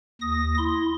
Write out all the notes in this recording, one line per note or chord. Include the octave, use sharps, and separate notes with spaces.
D#2 D#6 A#6
E4 C6